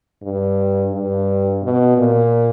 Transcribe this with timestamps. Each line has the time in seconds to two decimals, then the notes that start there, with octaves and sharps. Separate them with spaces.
0.22 G2
0.92 G2
1.63 B2
1.98 A#2